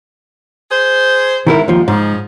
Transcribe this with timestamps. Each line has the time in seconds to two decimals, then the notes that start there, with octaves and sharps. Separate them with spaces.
0.71 G#4 C5
1.47 G#2 D#3 E4 A#4
1.68 D#2 F3
1.88 G#2 C#3 F3 D#4